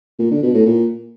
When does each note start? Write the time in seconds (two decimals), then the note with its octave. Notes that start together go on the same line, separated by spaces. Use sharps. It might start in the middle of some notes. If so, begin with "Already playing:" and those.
0.19 A#2
0.31 D3
0.43 B2
0.54 A2
0.66 A#2